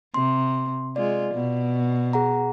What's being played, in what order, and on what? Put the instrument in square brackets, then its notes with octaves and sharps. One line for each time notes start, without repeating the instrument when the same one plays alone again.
[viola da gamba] C3 [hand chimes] C6
[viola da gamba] G#3 F4 [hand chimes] D5
[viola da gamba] B2
[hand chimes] G#4 F#5 A#5